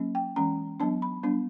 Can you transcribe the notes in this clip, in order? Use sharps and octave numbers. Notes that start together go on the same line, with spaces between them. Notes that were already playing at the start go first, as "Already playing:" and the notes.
Already playing: F#3 A#3 C#4
G5
E3 G#3 C#4 A#5
F#3 B3 D4 A5
B5
G3 B3 D4